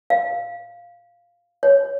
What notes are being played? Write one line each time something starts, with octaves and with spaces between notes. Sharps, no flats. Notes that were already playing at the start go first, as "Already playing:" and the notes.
F5
C#5